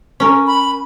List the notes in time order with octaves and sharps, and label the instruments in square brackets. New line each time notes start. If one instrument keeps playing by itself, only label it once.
[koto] C#4 A#4
[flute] B5